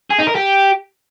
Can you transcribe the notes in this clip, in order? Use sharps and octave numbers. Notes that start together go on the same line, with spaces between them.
G#4
D#4
A#4
G4